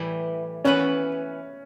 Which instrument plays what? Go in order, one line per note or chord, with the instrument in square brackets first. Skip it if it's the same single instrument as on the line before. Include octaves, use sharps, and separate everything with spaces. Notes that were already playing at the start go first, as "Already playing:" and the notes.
Already playing: [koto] A2 E3 G3
[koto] E3 B3 F#4 B4 [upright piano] C#4